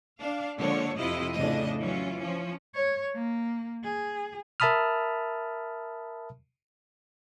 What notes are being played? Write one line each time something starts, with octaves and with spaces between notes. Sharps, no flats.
D4 F5
D3 F3 G#3 A#3 D4 C#5
F2 C3 F3 E4 F4 D#5
F2 A2 C#3 D4 D#5
E3 F#3 C#4 F4
F3 C#4
C#5
A#3
G#4
A#4 E5 A5 B5 D#6 F6